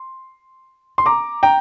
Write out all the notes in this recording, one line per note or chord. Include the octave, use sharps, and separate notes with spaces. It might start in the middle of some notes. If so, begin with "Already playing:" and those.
Already playing: C6
C6
A#5 D6
G5 A#5